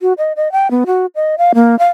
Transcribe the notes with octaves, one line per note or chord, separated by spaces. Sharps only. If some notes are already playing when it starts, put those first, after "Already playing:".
F#4
D#5
D#5
G5
B3
F#4
D#5
F5
A#3
F5